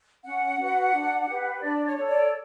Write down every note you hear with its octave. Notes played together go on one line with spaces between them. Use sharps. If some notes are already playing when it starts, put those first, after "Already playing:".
C#4 F#5
F#4 B4
D4
G4 B4
D4 D5
C#5
A4 C#5
D5